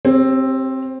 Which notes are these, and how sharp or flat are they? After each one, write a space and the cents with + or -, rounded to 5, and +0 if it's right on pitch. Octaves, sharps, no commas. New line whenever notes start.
C4 +10 G4 +0 C#5 -35